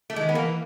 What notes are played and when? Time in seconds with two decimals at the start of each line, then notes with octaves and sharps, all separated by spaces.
0.10 A3
0.16 D#3 G#3
0.29 B3
0.35 E3 A#3